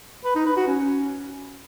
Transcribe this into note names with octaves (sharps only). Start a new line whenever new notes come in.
B4
D#4
B4
F#4
C#4